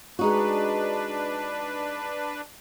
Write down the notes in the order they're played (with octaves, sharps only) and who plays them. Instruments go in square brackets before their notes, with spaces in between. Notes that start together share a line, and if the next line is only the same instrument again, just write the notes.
[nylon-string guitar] G#3 D#4 F#4 [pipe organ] D4 B4